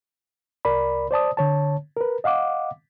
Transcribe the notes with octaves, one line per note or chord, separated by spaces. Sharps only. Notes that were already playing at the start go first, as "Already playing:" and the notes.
C2 A#4 D5 B5
C5 D5 A5 D#6
D3 C#5 A5
A#4 B4
D#5 F5 F#5 D6